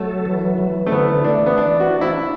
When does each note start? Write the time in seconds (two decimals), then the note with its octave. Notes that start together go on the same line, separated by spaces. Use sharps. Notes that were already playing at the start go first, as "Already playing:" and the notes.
Already playing: F#3 A3 A4
0.25 E3
0.58 E3
0.86 A3
0.91 D3 B3
1.24 A3 D4
1.46 B3
1.57 E3 D4
1.80 F#4
1.91 D4
2.01 E4